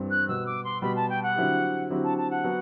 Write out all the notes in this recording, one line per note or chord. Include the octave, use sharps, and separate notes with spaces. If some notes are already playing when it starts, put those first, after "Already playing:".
Already playing: G2 E3 G3 C4 G4
F#6
B2 G3 B3 E6
D6
C6
B2 G3 B3 B5
A5
G5
F#5
D3 F#3 C4 E4 G4
D3 F#3 C4 E4 G4
A5
A5
F#5
F#3 B3